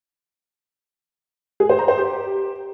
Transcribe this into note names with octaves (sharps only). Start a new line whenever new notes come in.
G#4
C5
A#5
C5
G4